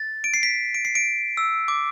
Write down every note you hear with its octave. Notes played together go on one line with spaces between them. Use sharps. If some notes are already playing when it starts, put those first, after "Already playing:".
Already playing: A6
D7
C7
B6
D7
C7
D7
E6
D6